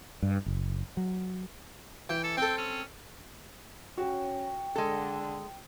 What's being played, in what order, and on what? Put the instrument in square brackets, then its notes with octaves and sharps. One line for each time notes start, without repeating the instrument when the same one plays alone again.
[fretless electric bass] G2
F#1
F#3
[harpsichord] E3 [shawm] G5
[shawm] A4
[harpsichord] C4 A4 [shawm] G5
[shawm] C#4
[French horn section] C#4 [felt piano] F#4 [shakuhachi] G5
[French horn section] D3 [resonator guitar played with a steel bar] G#3 A4